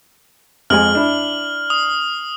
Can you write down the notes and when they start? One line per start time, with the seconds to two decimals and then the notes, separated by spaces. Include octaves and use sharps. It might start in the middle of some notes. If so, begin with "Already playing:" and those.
0.70 F2 G#3 G#5 F6 F#7
0.95 D4 E4
1.70 D#6